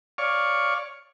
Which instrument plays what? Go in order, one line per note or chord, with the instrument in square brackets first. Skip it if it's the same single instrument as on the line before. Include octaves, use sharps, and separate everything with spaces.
[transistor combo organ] C#5 D5 F5 C#6